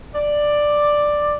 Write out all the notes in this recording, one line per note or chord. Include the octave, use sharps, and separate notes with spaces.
D5